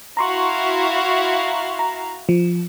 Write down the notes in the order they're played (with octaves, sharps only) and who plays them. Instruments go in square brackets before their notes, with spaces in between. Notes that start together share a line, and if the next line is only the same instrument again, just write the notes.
[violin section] E4 F#4 F5 [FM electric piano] A#5 C6 C#6
[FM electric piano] A#5
F3